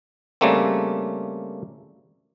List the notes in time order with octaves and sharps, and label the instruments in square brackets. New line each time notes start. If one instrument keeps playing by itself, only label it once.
[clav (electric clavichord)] C#3 G3 A3 A#3 C4